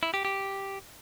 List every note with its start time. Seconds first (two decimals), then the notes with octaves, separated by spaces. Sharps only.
0.03 E4
0.14 G4
0.25 G4